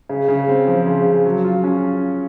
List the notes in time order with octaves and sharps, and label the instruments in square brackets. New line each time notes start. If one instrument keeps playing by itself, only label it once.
[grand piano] C#3
C#3
C4
F3
C#3
C#3
F#3
F4
C#4